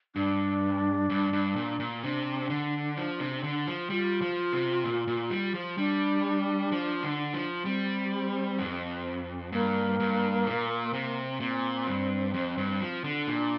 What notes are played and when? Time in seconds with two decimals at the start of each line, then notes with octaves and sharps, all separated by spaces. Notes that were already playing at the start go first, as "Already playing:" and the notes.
0.15 G2 D4
1.10 G2
1.33 G2
1.56 A#2
1.80 A#2
2.03 C3 D4
2.50 D3
2.97 F3
3.20 C3
3.43 D3
3.67 F3
3.90 G3 F4
4.22 F3
4.53 C3
4.84 A#2
5.07 A#2
5.31 G3
5.54 F3
5.78 G3 D4
6.72 F3
7.03 D3
7.34 F3
7.65 G3 C4
8.59 F2
9.52 G2 A#3
10.00 G2
10.46 A#2
10.93 C3
11.40 A#2 C4
11.87 G2
12.34 F2
12.58 G2
12.81 F3
13.04 D3
13.27 A#2 D4